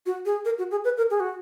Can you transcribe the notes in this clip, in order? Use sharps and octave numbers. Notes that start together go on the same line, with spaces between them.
F#4
G#4
A#4
F#4
G#4
B4
A#4
G#4
F#4